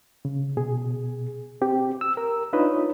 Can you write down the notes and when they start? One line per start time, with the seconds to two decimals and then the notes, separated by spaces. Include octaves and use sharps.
0.25 C#3
0.57 B2 G#4
1.61 C4 G4
2.01 E6
2.17 A#4
2.53 D4 D#4 F4 B4 C#5 D#5